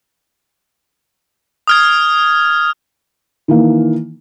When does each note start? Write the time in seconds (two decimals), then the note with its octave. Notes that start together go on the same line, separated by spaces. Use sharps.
1.67 D#6 F6 G#6
3.48 D#3 E3 A#3